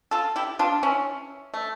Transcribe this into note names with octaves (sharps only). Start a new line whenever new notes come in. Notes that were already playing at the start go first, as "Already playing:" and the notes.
F4 A4
E4 G4
D4 F4
C#4 E4
A3